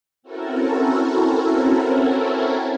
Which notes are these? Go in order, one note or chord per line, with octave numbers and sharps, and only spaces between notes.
C4 C#4 E4 F#4 A4 A#4